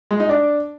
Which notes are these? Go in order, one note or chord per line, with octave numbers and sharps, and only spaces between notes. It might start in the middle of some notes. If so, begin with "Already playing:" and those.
G#3
D#4
D4